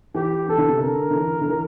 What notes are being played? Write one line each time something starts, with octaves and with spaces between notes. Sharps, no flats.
E3 G4
E3 A4
D3
C3
D3 A#4
D3
E3
D3
E3